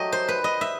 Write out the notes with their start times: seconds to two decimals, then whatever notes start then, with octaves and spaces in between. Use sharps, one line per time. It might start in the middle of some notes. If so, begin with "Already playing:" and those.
Already playing: F#3 A3 G4 D#5
0.12 C5
0.29 B4
0.44 D#5
0.61 E5